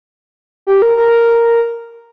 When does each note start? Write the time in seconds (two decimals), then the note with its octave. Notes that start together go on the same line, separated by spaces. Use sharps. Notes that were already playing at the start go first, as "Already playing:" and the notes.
0.67 G4
0.82 A#4
0.97 A#4